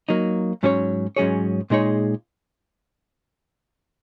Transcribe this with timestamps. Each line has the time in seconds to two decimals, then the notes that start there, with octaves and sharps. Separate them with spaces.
0.09 F#3 A#3 D#4
0.63 G#2 F#3 C#4 G#4 C#5
1.16 G#2 F#3 C#4 G#4 C#5
1.70 A#2 G#3 D#4 G#4 C#5